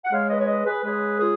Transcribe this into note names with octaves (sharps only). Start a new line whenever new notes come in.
F#5
C#3 G#3 C#5 F5
B4 D#5
C#5
B4 D#5
G#4 B4
C#3 G#3 G#4 B4
F4 G#4